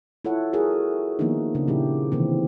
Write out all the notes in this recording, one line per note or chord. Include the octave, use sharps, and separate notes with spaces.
E4 F4 A4 C#5 F#5
F4 F#4 G#4 A#4 C#5 E5
D#3 F3 A#3 B3 D4 D#4
C#3 D4
A#2 F3 A3 C#4 E4 G4
C3 D#3 E3 A#3 C4